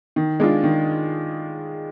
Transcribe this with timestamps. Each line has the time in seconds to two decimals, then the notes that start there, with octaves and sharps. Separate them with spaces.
0.16 D#3
0.40 G#3 D4 F4
0.64 D#3